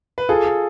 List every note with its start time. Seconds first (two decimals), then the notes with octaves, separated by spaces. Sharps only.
0.18 B4
0.29 F4 G#4 A4
0.47 A4